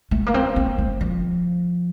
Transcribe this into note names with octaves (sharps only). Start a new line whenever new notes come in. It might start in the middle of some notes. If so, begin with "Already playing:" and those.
A3
A#3
C4
A#3
A3
F3